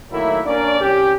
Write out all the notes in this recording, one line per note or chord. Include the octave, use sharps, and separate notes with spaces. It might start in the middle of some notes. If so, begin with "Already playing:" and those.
D#3 F#3 A3 A#3 E4
A#3 C#4 D4 D5
C2 C#4 G4